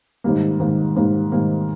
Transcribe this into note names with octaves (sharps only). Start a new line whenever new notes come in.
G#2 D#3 G3 A#3
G#2 D#3 G3 A#3
G#2 D#3 G3 A#3
G#2 D#3 G3 A#3